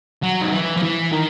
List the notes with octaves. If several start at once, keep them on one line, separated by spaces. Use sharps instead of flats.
F#3
D#3
E3
F3
E3
D#3